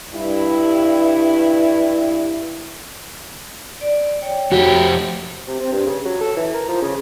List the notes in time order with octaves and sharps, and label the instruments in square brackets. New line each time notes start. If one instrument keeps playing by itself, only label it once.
[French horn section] G2 E4
[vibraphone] D5
C#5 G5
[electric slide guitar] F2 A3 G4 [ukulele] F#4
[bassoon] C3
C4
G2
C#3
F#3
A4
E3
A#4
F3
C#3